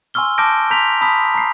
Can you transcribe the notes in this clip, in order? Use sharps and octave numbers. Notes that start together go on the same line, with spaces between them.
G#5 C6 C#6 E6 F6 G7
A5 D6 F6 G6 A#6 D7
A#5 C6 G6 B6 F7
A5 B5 C6 D#6 B6
A#5 C7